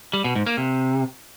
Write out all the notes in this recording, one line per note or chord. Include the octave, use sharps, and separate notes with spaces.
G3
B2
G#2
A#3
C3